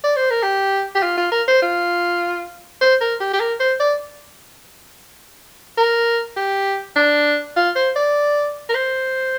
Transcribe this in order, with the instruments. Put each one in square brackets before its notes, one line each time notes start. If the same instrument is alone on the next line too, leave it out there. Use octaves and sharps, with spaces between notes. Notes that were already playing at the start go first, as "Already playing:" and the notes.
[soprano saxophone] D5
C5
A#4
G4
G4
F4
F4
A#4
C5
F4
C5
A#4
G4
G4
A#4
C5
D5
A#4
G4
D4
F4
C5
D5
A#4
C5